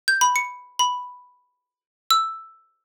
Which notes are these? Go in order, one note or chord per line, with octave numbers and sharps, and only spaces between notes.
G6
B5
C#7
B5
E6